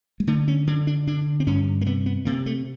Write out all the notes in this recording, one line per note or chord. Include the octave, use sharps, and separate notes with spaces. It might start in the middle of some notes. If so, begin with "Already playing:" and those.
G#3
D3 A3
C#4
D3 D4
D4
D3 D4
C4
G2 C#4
A#3
C3 B3
B3
C3 A#3
A3